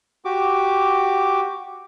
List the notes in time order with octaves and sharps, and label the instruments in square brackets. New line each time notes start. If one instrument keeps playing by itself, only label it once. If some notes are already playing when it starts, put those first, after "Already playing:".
[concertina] F#4 G4 D6